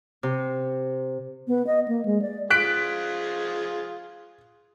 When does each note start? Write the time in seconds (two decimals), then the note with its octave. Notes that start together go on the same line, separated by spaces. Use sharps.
0.23 C3
1.48 B3
1.67 D#5
1.88 A#3
2.05 G#3
2.22 D5
2.50 F3 F4 G#4 F#6 B6 D7